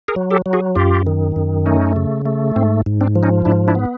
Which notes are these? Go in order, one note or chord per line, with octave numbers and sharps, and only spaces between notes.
G#4 A#4
F#3
G4 A4
F#3
F#4 G#4
F#2 F4 G4
D#3
F#2
A3 C#4 D#4
C#3
A3
G#2 C4
G#2
C4 D4
F3
C#4 D#4
G#2 D4 E4
D4 E4
B3